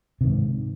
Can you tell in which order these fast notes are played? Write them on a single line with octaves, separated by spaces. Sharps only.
C3 D#3 G#2